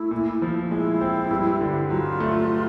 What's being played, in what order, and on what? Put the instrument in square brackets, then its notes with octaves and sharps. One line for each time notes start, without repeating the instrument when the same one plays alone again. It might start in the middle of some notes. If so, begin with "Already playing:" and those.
Already playing: [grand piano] A3 [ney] E4
[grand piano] A#2
F3
[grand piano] G#3 [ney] E4
[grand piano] C4
G2
D3
[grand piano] F#3 [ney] F4
[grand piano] A3